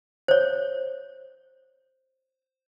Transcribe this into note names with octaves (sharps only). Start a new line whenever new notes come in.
C5 C#5